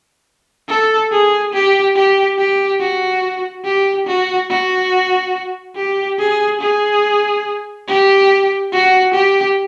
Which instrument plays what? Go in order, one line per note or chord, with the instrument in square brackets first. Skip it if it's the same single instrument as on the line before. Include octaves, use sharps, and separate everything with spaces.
[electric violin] A4
G#4
G4
G4
G4
F#4
G4
F#4
F#4
G4
G#4
G#4
G4
F#4
G4